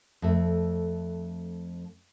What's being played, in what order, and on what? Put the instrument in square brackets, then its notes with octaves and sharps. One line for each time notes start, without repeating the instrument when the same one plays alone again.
[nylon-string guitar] F2 A3